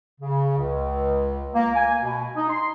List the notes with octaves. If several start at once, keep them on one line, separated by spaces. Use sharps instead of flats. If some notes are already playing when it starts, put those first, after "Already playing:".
C#3
C#2
A#3
G#5
B2
D#4
C6